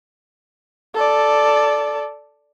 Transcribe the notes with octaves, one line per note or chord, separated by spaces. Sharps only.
A4 D5